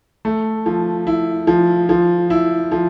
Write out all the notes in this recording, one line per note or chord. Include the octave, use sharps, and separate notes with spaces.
A3
F3
E4
F3
F3
E4
F3